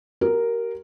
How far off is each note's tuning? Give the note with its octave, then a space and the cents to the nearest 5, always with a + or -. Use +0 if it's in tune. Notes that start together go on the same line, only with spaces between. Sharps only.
G4 -40 A#4 +0